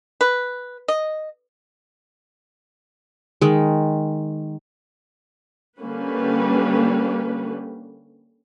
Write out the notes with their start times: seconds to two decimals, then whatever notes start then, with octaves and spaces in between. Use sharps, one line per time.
0.21 B4
0.88 D#5
3.41 D#3 G#3
5.79 D3 G3 A#3 C#4 B4